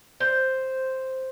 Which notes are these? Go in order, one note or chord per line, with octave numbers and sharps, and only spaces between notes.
C5